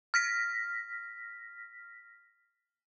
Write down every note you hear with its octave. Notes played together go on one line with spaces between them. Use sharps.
F6 A#6 B6